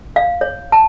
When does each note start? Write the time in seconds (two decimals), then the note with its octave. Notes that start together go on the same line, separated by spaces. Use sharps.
0.16 F5
0.41 C#5
0.72 A5